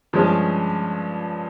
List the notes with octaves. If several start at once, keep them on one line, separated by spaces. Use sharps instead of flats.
G2 F3 G#3 C#4